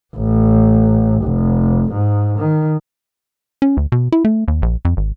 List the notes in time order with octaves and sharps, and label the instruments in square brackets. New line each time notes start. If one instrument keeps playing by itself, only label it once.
[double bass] A1
F1
G#2
D#3
[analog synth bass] C#4
D2
B2
E4
A3
D#2
A#1
F2
G#1